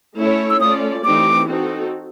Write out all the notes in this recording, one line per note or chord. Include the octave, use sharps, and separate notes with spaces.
A3 C#4 E4 A4 C#5
E6
A3 C#4 F4 A4 D5 D#6
E3 A3 C4 D#4 G4 D6
C4 D#4 F#4 A4